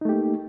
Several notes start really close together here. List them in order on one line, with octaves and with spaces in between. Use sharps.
D#4 A3 G4 A#3